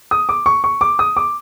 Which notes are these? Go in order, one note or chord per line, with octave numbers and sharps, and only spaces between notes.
D#6
D6
C#6
C#6
D6
D#6
D6